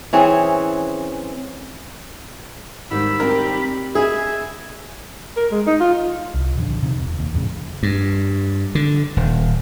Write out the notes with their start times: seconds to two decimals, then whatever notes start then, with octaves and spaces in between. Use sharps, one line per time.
0.13 E3 C4 C#4 G#4
2.91 G#2 D#3 G3 B5 E6
3.20 C4 G4 A#4
3.95 B3 G#4 D#5 E5 G#5
5.37 A#4
5.51 G#3
5.67 D#4
5.80 F4
6.34 C2
6.56 D#1 F2 D3
6.83 C3 D#3
7.00 E1
7.19 D#2
7.33 G#1 F2 A2 C#3
7.83 G2
8.75 D3
9.17 D#1